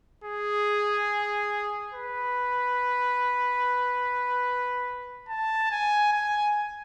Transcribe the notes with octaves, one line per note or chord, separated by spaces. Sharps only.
G#4
B4
A5
G#5
G#5